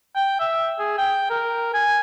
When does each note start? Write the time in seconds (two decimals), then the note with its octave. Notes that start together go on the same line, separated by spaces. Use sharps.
0.16 G5
0.40 E5
0.79 G#4
0.98 G5
1.30 A#4
1.74 G#5